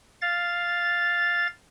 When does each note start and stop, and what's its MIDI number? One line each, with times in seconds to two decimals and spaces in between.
0.21 1.47 77
0.21 1.47 93